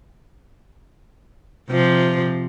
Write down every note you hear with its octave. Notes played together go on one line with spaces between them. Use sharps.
C3 F3